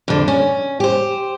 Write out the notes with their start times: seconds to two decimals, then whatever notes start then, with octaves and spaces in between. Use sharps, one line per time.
0.08 F2 D3
0.28 C#4
0.80 G4 C5